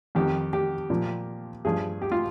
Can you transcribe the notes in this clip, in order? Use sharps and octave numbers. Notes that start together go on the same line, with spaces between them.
F2 D#3 G4
G4
A#2 F3
G2 F3 G#4
G4
F4